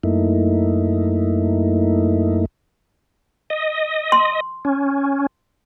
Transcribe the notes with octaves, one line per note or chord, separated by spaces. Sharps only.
F#2 A3 A#3 D#4 E4
D#5
C6
C#4